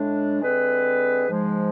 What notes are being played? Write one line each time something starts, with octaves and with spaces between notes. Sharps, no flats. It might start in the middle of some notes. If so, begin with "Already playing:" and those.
Already playing: A2 G#3 D4
D3 G#3 C4 G#4 B4
G#2 F3 G#3